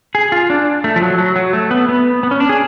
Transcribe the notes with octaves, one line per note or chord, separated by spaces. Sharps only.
G#4
F4
D4
A3
F3
F#3
F#3
F#3
A3
B3
B3
B3
C#4
D4
G#4